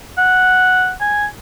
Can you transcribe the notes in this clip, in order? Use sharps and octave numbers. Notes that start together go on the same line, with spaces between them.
F#5
G#5